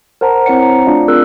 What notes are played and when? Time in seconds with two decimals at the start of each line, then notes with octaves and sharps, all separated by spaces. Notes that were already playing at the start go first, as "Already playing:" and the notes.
0.21 A#4 C5 F#5 A5 A#5
0.46 C4 E4 C5 C#5 F#5 C#7
0.62 A#5
0.86 A3 D4 F4 D5 F5
1.08 C4 F4 G#4 A#4 E6 F#6